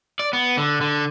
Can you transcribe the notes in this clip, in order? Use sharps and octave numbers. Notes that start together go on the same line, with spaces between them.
D5
B3
D3
D3